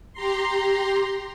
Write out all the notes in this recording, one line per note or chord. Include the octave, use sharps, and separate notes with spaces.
G4 A#5 C6